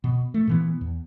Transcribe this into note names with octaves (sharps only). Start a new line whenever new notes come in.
B2
A3
A#2 E3 B3
E2